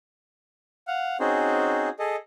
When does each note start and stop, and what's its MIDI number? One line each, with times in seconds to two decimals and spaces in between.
0.87 1.17 77
0.87 1.17 78
1.20 1.89 60
1.20 1.89 61
1.20 1.89 63
1.20 1.89 66
1.20 1.89 68
1.20 1.89 72
1.99 2.16 68
1.99 2.16 69
1.99 2.16 75